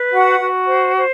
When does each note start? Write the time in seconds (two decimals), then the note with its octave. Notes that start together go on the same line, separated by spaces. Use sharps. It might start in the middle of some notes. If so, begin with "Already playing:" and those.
Already playing: B4
0.11 F#4 F#5
0.39 F#4
0.68 C5
0.97 C5